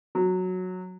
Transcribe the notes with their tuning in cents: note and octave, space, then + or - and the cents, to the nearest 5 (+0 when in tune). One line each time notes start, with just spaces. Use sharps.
F#3 -10